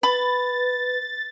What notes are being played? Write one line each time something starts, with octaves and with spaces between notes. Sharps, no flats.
B4 B5 A6